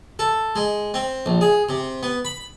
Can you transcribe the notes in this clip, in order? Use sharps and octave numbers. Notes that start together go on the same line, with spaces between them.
A4
G#3
C4
A#1
G#4
C3
B3
B5